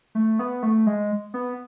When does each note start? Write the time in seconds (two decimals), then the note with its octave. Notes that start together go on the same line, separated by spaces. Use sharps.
0.15 A3
0.39 B3
0.63 A3
0.87 G#3
1.34 B3